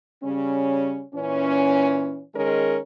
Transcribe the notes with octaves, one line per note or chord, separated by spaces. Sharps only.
C#3 G3 C#4
A#2 E3 C#4
D#3 G#3 C#4 G#4 A#4